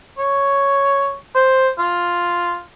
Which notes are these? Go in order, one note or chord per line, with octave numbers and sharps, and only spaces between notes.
C#5
C5
F4